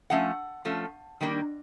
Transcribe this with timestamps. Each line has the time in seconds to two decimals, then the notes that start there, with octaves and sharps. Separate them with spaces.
0.10 F3 A3 C#4 F#5
0.65 F3 A3 C#4
1.21 D#3 G3 A#3 D4